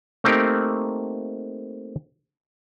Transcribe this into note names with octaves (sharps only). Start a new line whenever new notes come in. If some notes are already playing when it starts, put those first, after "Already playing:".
A3 A#3 C4 D#4 G4 A#4